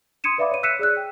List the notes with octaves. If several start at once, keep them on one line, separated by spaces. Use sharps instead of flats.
C6 D#6 G#6 C#7 D#7 E7
B4 D5 E5 F5 B5 D6
C#5 D#7
E6 F#6 B6 C#7 D#7 E7
G#4 D5 E6 F#6
G5